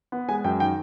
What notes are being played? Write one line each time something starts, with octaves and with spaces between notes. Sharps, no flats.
B3
G#3 G#5
F#2 G5
D#3 G5